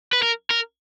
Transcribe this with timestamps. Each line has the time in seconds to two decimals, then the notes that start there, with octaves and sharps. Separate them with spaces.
0.13 B4
0.22 A#4
0.51 A#4